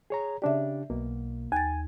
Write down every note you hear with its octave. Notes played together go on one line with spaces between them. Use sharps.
G#4 C#5 A#5
C#3 D4 G4 D5 E5
B1 B2 A#3
D#2 G#5 A6